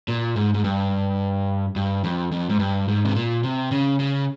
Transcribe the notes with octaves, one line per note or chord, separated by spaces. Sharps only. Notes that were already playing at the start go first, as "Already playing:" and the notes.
A#2
G#2
G#2
G2
G2
F2
F2
G#2
G2
G#2
C3
A#2
C3
C#3
C#3